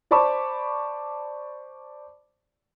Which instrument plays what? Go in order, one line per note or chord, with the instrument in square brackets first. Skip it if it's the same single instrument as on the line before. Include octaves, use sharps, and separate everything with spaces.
[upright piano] C5 D5 A5 B5 C#6 D6